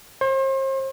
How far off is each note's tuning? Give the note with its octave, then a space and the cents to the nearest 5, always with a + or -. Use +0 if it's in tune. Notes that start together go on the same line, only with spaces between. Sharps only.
C5 +40